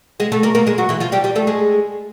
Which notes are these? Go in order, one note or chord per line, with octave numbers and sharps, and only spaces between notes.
G#3 G#4
A3 A4
A#3 A#4
A#3 A#4
G#3 G#4
F#3 F#4
E3 E4
F3 F4
G3 G4
G3 G4
A3 A4
G#3 G#4